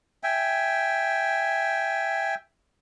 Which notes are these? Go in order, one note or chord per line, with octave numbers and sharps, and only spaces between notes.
E5 G5 G#5